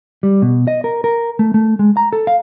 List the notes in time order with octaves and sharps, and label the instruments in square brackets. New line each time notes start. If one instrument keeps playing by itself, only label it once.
[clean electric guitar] G3
B2
D#5
A#4
A#4
A3
A3
G#3
A#5
A4
F5